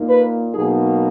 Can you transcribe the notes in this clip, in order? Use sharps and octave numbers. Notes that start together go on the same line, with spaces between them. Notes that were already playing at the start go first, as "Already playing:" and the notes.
Already playing: A#2 A#3 D#4
B4
B2 F#3 A#3 D#4 G#4